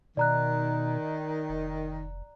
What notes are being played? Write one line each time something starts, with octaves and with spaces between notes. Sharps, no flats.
B2 D#3 D5 A#5 F#6
F1